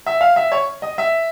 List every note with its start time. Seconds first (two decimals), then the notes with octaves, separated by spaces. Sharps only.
0.06 E5
0.21 F5
0.36 E5
0.52 C#5
0.82 D#5
0.98 E5